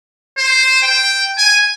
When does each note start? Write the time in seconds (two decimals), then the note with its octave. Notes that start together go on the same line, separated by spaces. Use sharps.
0.38 C5
0.82 G5
1.38 G#5